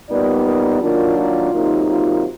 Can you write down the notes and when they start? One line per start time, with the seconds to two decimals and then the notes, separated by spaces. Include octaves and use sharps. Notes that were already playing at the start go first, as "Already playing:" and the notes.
0.09 A#2 G3 B3 D#4 D5
0.45 A#4
0.81 D#3 F#3 A#3 D4 F4
1.17 F4
1.52 C3 D#3 F#3 A#3 D#4
1.88 F4